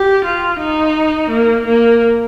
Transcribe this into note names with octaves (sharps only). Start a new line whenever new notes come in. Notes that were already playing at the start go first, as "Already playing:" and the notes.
Already playing: G4
F4
D#4
A#3
A#3